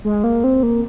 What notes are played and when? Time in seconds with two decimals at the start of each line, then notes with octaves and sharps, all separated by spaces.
0.04 G#3
0.24 A#3
0.44 C4
0.63 A#3